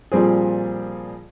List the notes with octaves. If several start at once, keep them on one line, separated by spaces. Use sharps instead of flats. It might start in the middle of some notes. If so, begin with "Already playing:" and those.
A#2 F3 G3 C4 G#4